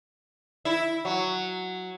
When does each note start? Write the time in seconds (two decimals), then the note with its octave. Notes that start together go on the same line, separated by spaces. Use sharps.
0.65 E4
1.05 F#3